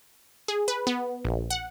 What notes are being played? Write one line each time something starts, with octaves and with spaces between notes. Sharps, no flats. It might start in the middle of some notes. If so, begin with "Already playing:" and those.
G#4
B4
B3
A#1
F#5